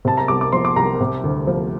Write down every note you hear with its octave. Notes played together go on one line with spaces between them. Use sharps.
C3 A5
A#5
C2 D6
D6
F3 C6
D6
C2 A#5
C3
D2
F3